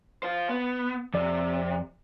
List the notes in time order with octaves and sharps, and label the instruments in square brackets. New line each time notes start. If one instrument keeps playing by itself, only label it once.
[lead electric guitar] F4 C5
B3
[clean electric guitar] F2 D5 [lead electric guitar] C3